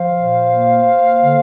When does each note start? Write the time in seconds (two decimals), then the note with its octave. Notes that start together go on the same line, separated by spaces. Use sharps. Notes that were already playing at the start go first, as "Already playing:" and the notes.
Already playing: F3 C5 F5
0.15 A#2
0.50 A#3
0.85 A#3
1.20 D3